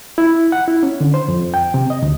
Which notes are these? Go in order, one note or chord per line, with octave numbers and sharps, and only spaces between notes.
E4
F#5
E4
C#4
D3
C5
F2
G5
C3
D#5
D2